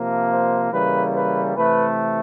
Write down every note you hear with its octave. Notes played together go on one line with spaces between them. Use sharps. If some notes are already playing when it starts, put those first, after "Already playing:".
Already playing: C3 F3 A#3
C5
C#3 E3 G3 A#3 B4
B4
C3 E3 A3 B4